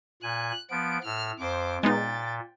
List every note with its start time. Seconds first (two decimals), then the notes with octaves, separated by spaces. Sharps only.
0.23 A#2 G#5 F#6
0.70 F3 B3 D7
1.04 A2 E6 F6
1.39 F2 C5 D6
1.83 A#2 G#3 B3 D#4 G5 A6